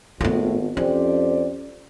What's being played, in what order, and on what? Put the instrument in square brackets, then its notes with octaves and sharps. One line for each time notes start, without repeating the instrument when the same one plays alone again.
[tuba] G#1 [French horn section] A2 A3 [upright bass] B3 F4
[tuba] F2 [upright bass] C#4 [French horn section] G4 C5 D5